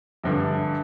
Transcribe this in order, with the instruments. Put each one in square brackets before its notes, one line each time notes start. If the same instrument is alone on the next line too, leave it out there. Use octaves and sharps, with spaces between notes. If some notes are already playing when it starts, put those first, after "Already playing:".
[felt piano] A#1 G2 D3